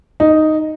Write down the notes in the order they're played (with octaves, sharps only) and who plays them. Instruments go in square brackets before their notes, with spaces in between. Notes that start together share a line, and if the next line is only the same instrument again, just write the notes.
[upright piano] D#4